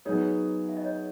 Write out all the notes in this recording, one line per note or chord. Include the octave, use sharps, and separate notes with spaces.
F#3 B3 D#4 G#4 C#5
E5
D#5
C#5